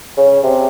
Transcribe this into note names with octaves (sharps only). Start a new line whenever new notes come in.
C#3
C3